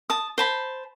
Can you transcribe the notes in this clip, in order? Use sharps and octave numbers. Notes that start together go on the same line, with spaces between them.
A5 D#6
C5 A5 B5